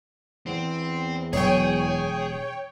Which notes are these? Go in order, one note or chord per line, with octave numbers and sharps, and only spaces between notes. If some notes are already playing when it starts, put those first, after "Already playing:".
E2 C4
E1 F#3 G#4 C#5 G5